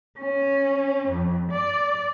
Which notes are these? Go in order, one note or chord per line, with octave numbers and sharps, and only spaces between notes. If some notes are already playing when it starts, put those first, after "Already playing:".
C#4
F2
D5